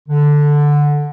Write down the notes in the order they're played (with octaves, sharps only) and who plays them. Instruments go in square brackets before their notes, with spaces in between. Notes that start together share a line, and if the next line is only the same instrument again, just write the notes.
[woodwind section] D3